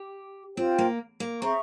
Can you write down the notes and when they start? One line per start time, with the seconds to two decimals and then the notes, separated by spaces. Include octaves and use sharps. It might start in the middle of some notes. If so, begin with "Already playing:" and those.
Already playing: G4
0.57 C4 F4 C5 G5
0.78 A#3
1.20 A#3
1.41 C4 G#4 E5 A#5 C#6